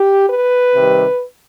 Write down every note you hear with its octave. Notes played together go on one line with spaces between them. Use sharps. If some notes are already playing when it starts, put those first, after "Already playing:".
Already playing: G4
B4
C3 D#3 G3